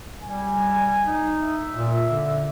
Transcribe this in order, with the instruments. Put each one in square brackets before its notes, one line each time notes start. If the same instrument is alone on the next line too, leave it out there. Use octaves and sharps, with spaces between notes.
[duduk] G3 [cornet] G#5
[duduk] D#4
[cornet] E5
[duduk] A#2
D3